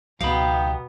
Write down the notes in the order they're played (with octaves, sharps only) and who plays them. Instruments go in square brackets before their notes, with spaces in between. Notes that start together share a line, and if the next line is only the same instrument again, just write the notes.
[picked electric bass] C#2 F#3 [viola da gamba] B2 B3 [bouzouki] D#4 G4 [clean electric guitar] F5 B5